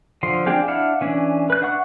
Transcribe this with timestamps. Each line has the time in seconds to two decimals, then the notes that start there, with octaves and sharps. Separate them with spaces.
0.23 D3 F3 C6
0.46 C4 D4 G4 G#4 F5
0.68 D4 E4 F5 F#5
1.01 E3 C#4 D4
1.50 B4 F#6
1.62 D4 E5 F#5 C#6 F#6